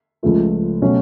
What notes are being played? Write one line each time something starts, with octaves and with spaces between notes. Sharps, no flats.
C#2 C#3 F3 A3 F4
B2 F#3 A3 C#4